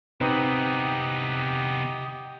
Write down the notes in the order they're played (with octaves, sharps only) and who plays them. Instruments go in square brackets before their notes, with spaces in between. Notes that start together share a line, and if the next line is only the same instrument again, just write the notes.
[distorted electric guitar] C3 B3 [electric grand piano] C4 B4 [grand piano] D#4 [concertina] G4 D#5